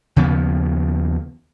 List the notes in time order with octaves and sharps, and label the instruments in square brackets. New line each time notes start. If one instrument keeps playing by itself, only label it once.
[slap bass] D#2 C#3 F3 B3